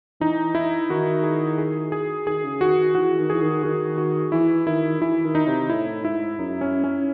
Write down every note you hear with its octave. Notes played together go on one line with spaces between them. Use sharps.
E3 D#4
E4
D#3 F#4
G#4
G#4
G#4
D#3 G#4
C#3
D#3 F#4
D#3
E3 F#4
D#3
E3 G#4
D#3
D#3 F#4
F#4
E3 E4
D#3 E4
E3 E4
D#3
D#4
C3
A2 E4
G#2 E4
F#2 D#4
C#4
C#4